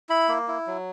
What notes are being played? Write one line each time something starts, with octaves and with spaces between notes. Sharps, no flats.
E4 B5
A#3
E4
F#3